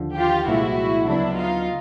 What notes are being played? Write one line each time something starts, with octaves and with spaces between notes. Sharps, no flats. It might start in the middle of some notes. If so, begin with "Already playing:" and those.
Already playing: D#2 D3 F3
F4 G4
C2 A#2 F3 G#3 E4 F#4
D2 C#3 F#3 B3 D4 E4
D#4 F4